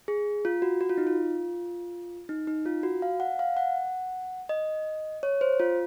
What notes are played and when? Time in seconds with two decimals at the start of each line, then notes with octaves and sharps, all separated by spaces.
0.08 G#4
0.45 F4
0.62 F#4
0.81 F#4
0.89 F4
0.98 D#4
1.07 F4
2.29 D#4
2.47 D#4
2.66 F4
2.83 F#4
3.02 F5
3.20 F#5
3.39 F5
3.57 F#5
4.49 D#5
5.23 C#5
5.41 C5
5.60 F4